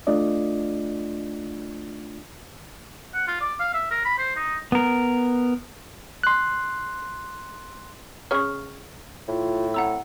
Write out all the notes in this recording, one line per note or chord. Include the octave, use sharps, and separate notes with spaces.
A3 D4 F4 D5 D#5
F#5
F4
D5
F5
E5
A#4
B5
C5
D#4
B3 A#4
C6 F#6
C#3 G#4 C#5 C#6 F6
A2 F4
C4 F#5 A#5 E6